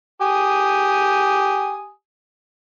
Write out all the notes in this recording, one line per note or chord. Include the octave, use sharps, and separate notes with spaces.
G4 G#5 D#6